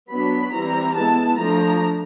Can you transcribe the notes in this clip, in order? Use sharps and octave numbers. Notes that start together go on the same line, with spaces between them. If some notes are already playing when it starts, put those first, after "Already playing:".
F#3 B3 D4 B5
E3 G3 C4 E4 A#5
G#3 B3 E4 A5
F3 A3 D4 A#5